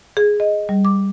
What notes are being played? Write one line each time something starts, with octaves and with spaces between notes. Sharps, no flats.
G#4
D#5
G3
D6